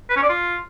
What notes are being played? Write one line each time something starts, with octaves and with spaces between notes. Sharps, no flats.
B4
C#4
D5
F4